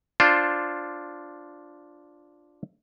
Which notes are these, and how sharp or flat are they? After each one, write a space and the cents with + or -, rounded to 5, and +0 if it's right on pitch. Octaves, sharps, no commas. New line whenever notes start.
D4 +0 F4 +0 C5 +15